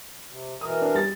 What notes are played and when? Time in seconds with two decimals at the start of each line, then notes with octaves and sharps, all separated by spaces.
0.30 C3
0.61 B2 E3 A#4 D#6
0.81 D4
0.94 G3 A6